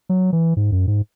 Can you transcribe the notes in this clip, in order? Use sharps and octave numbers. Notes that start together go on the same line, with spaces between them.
F#3
E3
G#2
F#2
G#2